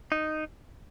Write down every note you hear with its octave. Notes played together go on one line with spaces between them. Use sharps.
D#4